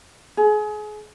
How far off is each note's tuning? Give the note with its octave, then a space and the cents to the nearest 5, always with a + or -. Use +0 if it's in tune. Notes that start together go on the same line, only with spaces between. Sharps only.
G#4 +30